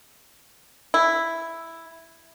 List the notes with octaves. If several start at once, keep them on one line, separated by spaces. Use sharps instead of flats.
E4